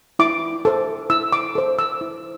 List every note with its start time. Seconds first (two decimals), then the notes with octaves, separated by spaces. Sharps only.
0.19 E4 D6
0.65 A4 C5
1.10 E4 E6
1.32 D6
1.55 A4 C5
1.79 E6
2.01 E4